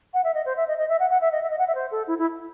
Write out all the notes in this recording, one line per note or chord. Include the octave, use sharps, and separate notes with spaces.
F#5
E5
D#5
C5
E5
D#5
D#5
E5
F#5
F#5
E5
D#5
E5
D#5
F#5
E5
C5
A4
E4
E4